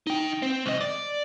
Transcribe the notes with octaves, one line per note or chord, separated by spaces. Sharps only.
D#4 G5
C4
C2 D#5
D5